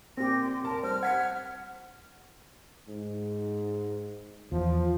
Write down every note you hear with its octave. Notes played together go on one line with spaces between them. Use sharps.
A#2 C4 G4 A#6
C6
F1 A#4 A5
G3 C5 F6
F#5 F6 G#6 B6 C#7
G#2
E2 F3